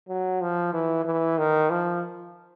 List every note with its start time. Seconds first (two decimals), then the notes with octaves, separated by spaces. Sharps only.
0.08 F#3
0.41 F3
0.73 E3
1.05 E3
1.38 D#3
1.70 F3